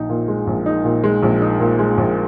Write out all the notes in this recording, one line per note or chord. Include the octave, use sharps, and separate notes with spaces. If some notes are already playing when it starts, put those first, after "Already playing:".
Already playing: A#1 D#4
A#2
G#3
A#1
D#4
A#2
G#3
A#1
D#4
A#2
G#3
A#1